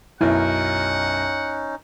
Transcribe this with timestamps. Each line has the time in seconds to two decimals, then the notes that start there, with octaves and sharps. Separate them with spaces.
0.21 B1 F#2 C#4 D#4 E4 F#5